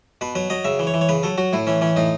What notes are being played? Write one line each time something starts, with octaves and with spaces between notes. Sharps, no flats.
B2 B4
F#3 B4
F#3 D#5
C#3 E5
E3
C#5
E3
C#5
C#3 B4
F#3 A4
F#3 F#4
A2 E4
E3 C#4
E3 C#4
A2 D#4